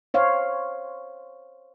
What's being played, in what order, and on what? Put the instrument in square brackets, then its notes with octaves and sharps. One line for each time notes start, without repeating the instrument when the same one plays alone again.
[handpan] C5 C#5 F5